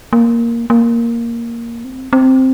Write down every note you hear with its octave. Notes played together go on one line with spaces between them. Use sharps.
A#3
A#3
C4
C4